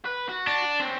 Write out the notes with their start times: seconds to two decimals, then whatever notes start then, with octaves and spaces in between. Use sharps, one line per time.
0.05 B4
0.29 F#4
0.47 D4
0.80 C4 C#4